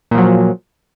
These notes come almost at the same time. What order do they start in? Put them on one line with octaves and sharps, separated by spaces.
A#2 F3 F#3